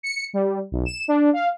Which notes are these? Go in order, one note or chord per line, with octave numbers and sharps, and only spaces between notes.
C#7
G3
B1
E7
D4
F5